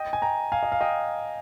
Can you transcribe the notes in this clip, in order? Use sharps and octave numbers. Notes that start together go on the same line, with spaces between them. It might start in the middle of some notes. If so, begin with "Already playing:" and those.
Already playing: D#5 G5
G#5
G5 A#5
F5 G#5
D#5
F5
D#5 G5